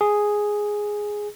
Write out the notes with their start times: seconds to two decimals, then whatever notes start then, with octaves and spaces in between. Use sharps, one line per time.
0.01 G#4